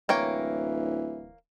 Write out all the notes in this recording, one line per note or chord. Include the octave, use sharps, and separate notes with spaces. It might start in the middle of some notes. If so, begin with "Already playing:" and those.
D1 E3 A#3 C#5 G5